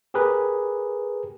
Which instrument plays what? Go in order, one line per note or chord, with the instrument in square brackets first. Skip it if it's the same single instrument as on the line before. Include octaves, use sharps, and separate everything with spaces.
[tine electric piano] G4 G#4 A#4 B4